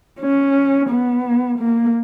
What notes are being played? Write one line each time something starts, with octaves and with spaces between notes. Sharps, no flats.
C#4
B3
A#3